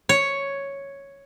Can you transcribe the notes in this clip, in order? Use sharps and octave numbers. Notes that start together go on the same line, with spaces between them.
C#5